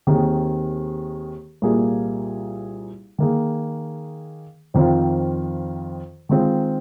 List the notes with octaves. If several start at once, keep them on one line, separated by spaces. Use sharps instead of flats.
D#2 D#3 C4 G#4
C2 A#2 A#3 F4 G#4
D#3 A#3 G#4
F2 D#3 C4 F4
D#3 G#3 C4 F4